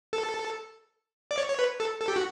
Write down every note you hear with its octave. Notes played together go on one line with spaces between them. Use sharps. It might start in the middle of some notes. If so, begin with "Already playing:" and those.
A4
D5
C#5
C#5
B4
A4
A4
G4
F#4